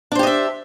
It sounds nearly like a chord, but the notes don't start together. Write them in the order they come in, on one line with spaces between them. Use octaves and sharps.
D4 C5 G4 D#5 E5